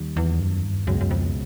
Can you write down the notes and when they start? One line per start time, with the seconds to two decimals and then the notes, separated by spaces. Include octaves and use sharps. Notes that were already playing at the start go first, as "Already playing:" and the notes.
Already playing: D#2 D#3 G3
0.16 E2
0.40 F#2
0.64 G2
0.87 C#2 F#2 B2 G#3
1.01 F#2
1.11 F2